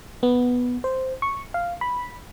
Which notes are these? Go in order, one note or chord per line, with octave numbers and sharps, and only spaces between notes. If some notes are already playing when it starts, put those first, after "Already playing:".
B3
C5
C#6
F5
B5